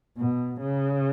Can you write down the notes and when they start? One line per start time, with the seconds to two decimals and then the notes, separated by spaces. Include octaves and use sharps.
0.18 B2
0.61 C#3